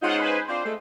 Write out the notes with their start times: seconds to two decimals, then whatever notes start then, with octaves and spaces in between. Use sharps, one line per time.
0.02 G#3 C#4 D#4 F4 C5 F#5
0.19 B4 C5 G#5
0.48 C4 D4 F4 C5
0.64 G#3 A3